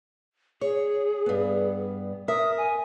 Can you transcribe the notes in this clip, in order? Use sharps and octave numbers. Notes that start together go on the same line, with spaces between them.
G#4 C#5
G2 B3
A#4 E5 D#6
G#5